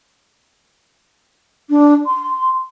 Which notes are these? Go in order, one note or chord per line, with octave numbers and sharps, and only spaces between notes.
D4
C6